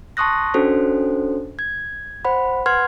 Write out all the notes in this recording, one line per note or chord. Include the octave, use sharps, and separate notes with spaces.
A5 C6 C#6 D#6 F#6 A#6
C#4 D4 F#4 A4 C5
G#6
C5 F#5 B5
B4 F#5 C6 F6 G#6